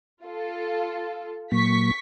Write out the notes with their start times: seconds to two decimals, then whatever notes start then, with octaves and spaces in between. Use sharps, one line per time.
0.24 F4 A4
1.52 A#2 F#3 A#3 C#6 B6